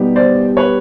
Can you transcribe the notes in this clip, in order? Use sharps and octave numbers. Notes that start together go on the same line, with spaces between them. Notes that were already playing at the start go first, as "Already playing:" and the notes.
Already playing: B2 G3 B3 D#4 G4
C5 D5
B4 C#5